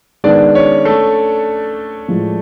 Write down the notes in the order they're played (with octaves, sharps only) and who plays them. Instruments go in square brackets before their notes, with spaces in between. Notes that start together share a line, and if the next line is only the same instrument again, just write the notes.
[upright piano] D#3 G#3 B3 [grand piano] D4 D5
[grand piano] C#4 C#5
A3 A4
[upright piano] A2 F3 G#3